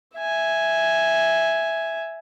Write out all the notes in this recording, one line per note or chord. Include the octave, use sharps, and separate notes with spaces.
E5 G#5